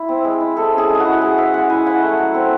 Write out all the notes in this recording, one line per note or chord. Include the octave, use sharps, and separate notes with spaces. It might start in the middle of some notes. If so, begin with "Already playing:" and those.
Already playing: E4
C4
G#3
E4
G#3 A4
C#4 G#4
G#3
G#4
F#4
E4
G#3 G#4
C#4 E5
G#3 F#5
E4 G#5
E4 F#5
A3
F#3
C4